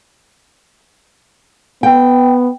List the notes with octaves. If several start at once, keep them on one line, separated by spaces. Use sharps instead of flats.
B3 G5